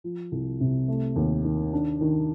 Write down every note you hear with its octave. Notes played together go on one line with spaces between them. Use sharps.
F3
C2
C3
A3
D#2
D#3
D4
D#3